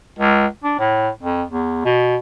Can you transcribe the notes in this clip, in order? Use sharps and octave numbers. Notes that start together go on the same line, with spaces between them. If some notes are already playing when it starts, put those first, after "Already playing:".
C#2
D4
A2
F2
E2
B2